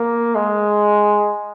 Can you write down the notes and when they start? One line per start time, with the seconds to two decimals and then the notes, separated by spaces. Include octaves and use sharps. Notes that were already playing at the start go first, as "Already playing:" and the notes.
Already playing: A#3
0.35 G#3